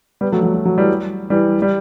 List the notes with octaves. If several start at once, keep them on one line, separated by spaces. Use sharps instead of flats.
G3 B3
F#3 A3
F#3
F#3
F#3
E3 G3
E3 G3
G3